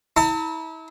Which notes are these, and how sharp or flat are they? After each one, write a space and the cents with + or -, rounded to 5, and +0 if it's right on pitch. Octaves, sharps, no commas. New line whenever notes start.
E4 -35 A5 +45